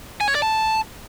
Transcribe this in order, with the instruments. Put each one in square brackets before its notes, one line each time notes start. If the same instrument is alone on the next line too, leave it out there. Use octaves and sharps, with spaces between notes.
[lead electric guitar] G#5
C#5
D5
A5